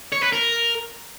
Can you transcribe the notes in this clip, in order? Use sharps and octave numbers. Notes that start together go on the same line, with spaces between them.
C#5
B4
A#4